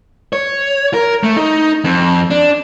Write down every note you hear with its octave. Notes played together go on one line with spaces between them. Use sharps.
C#5
A#4
A3
D#4
F2
D4